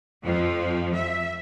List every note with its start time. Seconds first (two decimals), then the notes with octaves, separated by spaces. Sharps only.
0.22 F2 F3
0.94 E5